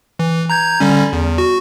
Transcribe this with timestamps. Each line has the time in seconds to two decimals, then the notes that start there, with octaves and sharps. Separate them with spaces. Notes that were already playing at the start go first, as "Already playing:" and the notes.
0.19 E3
0.50 A#5 G6 G#6
0.80 D3 G3 C#4
1.13 E2
1.38 F#4